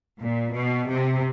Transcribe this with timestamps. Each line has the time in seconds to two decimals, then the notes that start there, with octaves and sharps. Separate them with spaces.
0.22 A#2
0.55 B2
0.90 C3